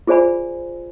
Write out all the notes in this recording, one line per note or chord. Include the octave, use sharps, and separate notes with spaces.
F4 G#4 C5 D5 G#5 B5